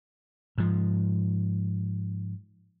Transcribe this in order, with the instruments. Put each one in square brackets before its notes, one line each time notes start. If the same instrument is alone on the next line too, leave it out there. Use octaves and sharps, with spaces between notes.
[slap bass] G#2 F3